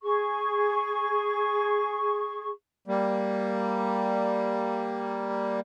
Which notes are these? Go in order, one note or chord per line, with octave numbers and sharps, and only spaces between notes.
G#4 C#6
G3 A#3